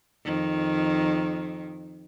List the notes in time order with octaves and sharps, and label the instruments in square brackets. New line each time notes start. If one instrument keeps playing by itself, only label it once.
[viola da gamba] F2 D#3